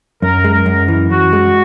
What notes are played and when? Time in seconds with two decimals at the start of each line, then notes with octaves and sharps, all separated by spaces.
0.22 F#2 A#4
0.44 G#3
0.52 A#4
0.66 F#2
0.88 E3
1.10 F#2 F#4
1.33 G#3